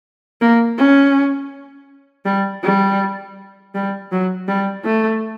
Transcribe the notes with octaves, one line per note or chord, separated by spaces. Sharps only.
A#3
C#4
G3
G3
G3
F#3
G3
A3